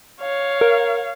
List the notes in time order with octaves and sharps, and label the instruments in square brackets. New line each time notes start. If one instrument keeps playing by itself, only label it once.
[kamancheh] C#5 F5
[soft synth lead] A#4